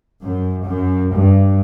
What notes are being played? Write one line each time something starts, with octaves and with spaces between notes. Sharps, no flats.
F#2
F#2
G2